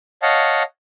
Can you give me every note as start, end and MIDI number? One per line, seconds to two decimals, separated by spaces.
0.22 0.63 73
0.22 0.63 75
0.22 0.63 77
0.22 0.63 78
0.22 0.63 81